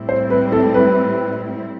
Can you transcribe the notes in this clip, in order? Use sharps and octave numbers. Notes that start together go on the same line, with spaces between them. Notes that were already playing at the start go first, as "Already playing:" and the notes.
Already playing: A2 G3 C4 E4
C5
B4
A4
B4